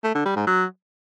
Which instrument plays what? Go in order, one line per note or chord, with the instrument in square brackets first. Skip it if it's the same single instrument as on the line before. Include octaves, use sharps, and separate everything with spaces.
[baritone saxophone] A3
D3
G3
G#2
F#3